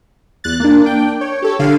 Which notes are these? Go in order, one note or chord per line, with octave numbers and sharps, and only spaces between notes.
E2 F#6 A6
A#3 D4
D4 G5
C#5
G4 A4 C#5
G1 D3 F5